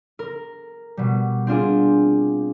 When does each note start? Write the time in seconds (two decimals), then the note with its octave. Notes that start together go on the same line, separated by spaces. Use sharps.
0.19 A#4
0.97 B2 G3
1.47 C4 D4 F4 G#4